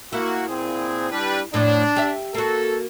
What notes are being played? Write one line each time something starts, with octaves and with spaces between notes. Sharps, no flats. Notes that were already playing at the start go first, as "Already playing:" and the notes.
A#3 E4 F#4
A#2 C4 G#4
G3 D4 B4
F2 A2 D4
G4 E5
A#3 F#4 A4